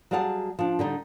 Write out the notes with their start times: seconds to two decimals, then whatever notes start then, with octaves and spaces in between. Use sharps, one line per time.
0.11 F#3 G3 G#4 F5 F#5 A5
0.59 F3 D4
0.79 D3 G3 D#4